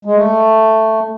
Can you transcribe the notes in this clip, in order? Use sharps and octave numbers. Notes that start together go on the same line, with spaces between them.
G#3
A3